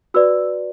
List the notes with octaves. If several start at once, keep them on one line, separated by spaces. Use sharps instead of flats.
F#4 B4 D5 E6